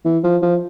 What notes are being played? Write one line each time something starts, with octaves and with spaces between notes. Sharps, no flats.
E3
F3
F3